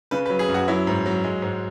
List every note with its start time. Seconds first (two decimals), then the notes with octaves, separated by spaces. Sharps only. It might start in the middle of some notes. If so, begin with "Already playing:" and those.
0.11 C#3 B4
0.26 B4
0.30 F#3
0.39 G#4
0.48 F#2
0.54 F#4
0.68 F#3 E4
0.87 G#2
1.06 F#3
1.24 G#3
1.42 G#2